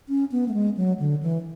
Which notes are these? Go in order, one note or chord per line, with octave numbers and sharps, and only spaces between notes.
C#4
B3
A3
G#3
F#3
D3
E3